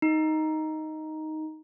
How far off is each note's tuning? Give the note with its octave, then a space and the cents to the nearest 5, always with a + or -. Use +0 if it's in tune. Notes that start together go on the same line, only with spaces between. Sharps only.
D#4 +5